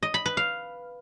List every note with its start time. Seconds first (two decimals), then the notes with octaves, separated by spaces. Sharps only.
0.03 D#5
0.14 B5
0.26 B4
0.37 F5